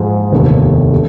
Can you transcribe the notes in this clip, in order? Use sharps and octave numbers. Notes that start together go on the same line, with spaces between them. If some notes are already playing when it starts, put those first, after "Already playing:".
Already playing: G#2 F3 G#3
F1 D#2 D3 G3 B3
D3